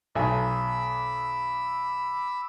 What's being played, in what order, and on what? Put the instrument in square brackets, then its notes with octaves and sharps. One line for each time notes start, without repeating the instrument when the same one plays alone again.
[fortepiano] B1 G#5 [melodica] B5 D6 E6